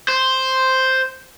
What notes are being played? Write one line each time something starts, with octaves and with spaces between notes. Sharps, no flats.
C5